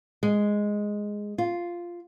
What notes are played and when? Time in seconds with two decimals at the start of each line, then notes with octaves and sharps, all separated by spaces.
0.23 G#3
1.38 F4